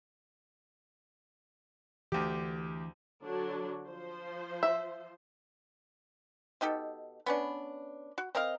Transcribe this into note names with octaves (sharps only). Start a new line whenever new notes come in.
D2 E3 D4 G4
D3 F#3 D4
F3 C5
E5
B2 D#4 G4 A4
B3 C#4 D4
F#4
C4 A#4 D#5 F5